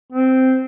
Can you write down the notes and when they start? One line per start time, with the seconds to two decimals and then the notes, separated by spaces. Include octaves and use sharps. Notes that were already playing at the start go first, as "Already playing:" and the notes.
0.12 C4